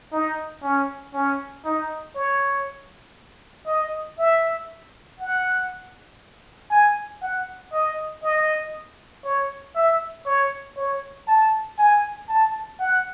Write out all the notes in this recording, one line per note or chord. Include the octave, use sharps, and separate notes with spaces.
D#4
C#4
C#4
D#4
C#5
D#5
E5
F#5
G#5
F#5
D#5
D#5
C#5
E5
C#5
C#5
A5
G#5
A5
F#5